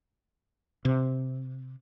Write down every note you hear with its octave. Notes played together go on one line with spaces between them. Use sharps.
C3